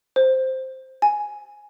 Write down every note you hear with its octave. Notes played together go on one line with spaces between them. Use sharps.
C5
G#5